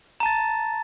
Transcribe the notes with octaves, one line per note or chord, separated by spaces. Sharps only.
A5 A#5 A6